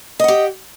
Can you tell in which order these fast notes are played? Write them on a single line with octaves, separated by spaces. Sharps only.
D#5 F#5 G4